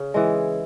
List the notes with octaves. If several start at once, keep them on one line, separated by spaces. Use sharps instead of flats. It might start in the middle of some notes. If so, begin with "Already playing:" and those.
Already playing: C#3
E3 G#3